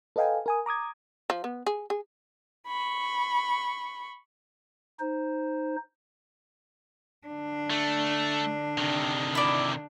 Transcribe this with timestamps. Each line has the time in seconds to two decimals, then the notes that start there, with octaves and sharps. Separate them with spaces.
0.16 A4 B4 D#5 F5 G5 G#5
0.46 A#4 G#5 D#6
0.66 A#5 D6 D#6 G#6
1.30 F3
1.44 B3
1.67 G#4
1.90 G#4
2.68 B5 C#6
5.00 D#4 C5
7.27 D3 D4
7.70 A3
8.78 C3 D#3
9.35 E4 D5